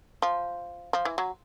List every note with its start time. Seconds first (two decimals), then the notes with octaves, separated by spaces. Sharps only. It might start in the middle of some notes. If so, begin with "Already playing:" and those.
0.22 F3
0.93 F3
1.05 E3
1.18 F#3